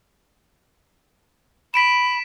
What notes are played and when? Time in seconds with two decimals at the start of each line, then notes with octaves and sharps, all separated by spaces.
1.74 B5 B6 D7 E7